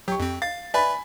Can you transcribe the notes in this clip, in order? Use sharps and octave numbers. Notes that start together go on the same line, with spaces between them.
F#3 G4 C#6
F2 C4
F5 A6
B4 D5 E5 G#5 B5